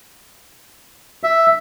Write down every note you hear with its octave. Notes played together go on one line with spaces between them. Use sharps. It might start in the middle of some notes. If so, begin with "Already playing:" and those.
E5